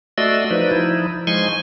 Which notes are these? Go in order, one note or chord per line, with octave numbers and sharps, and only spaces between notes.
A3 F#4 D5 D#5 C6 E6
F3 D#4 B4 D5
F3 D#4 E4
F3 G#3 D#4 G#5 C6 C#6